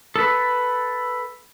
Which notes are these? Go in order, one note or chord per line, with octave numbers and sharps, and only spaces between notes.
A4 B4